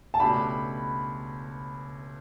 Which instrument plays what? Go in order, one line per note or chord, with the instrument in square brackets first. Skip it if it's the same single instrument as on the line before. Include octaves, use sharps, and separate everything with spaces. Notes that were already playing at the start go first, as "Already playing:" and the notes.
[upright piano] A5
[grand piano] C#2 B2 A3 D4 G4 [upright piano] B5